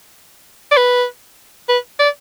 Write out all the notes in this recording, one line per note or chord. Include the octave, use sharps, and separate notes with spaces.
D5
B4
B4
D5